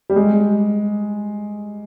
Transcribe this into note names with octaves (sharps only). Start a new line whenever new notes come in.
G3
G#3